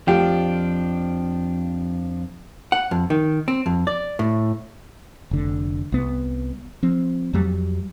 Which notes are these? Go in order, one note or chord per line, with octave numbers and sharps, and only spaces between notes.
F2 F3 D4 F4 G4
F#5
F2
D#3
C4
F2
D5
A2
F1 D3
C2 B3
F3 C4
F2 F#3 G3